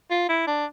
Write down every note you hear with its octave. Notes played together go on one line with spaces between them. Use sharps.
F4
E4
D4